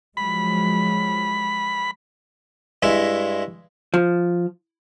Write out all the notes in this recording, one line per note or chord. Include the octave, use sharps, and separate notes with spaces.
F3 F#3 G#3 B5
G2 G#3 E4
F3